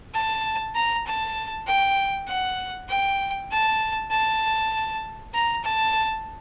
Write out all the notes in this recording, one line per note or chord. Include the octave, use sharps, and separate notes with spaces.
A5
A#5
A5
G5
F#5
G5
A5
A5
A#5
A5